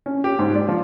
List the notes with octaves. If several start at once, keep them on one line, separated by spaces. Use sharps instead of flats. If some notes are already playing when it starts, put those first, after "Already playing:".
C#4
G4
G#2
D5
F3